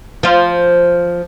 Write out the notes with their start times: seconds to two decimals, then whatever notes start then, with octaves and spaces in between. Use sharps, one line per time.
0.23 F3 F4